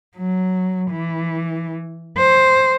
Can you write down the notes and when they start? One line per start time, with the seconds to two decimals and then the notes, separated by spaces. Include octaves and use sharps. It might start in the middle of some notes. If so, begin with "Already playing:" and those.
0.17 F#3
0.91 E3
2.18 C5